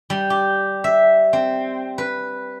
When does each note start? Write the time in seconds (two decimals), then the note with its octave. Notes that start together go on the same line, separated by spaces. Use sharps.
0.10 G3
0.30 G4
0.84 E5
1.33 C4
1.98 B4